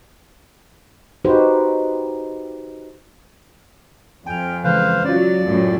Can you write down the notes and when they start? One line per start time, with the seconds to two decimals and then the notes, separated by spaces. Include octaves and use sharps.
1.25 D#4 F#4 G4 B4 C5
4.27 F2 G5 G#5 F6
4.64 C#3 E3 G#3 B4 C5 F5
5.05 F#3 C#4 F4 D5
5.44 F#2 A2 A3